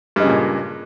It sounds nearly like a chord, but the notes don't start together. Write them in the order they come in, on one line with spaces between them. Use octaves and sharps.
G2 G#3 C#3 A#2